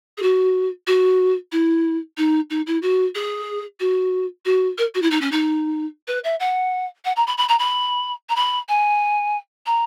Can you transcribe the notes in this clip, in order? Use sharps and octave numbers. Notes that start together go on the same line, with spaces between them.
G#4
F#4
F#4
E4
D#4
D#4
E4
F#4
G#4
F#4
F#4
A#4
F#4
E4
D#4
C#4
D#4
B4
E5
F#5
F#5
A#5
B5
B5
A#5
B5
A#5
B5
G#5
A#5